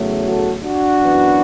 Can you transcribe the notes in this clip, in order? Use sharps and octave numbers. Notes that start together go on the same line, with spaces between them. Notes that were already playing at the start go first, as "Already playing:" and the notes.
Already playing: E2 C#3 F#3 A3
F#4 A4
D4 F#4
F#2 E3 B3